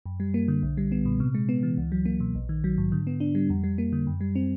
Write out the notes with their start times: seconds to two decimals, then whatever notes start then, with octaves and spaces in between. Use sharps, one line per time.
0.06 F#2
0.20 G3
0.34 A#3
0.48 D3
0.63 B1
0.77 G3
0.92 B3
1.05 A#2
1.20 C3
1.35 G#3
1.49 B3
1.63 E3
1.78 C#2
1.92 F#3
2.05 A#3
2.20 B2
2.35 A#1
2.49 D#3
2.64 F#3
2.78 G#2
2.92 D3
3.07 B3
3.20 D4
3.35 G3
3.50 F2
3.64 G3
3.78 A#3
3.93 D3
4.07 F#2
4.21 G3
4.35 C4